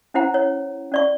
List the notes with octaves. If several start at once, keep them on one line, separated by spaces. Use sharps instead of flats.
C#4 E4 C5 F#5 A#5
C#5
C#4 D5 C#6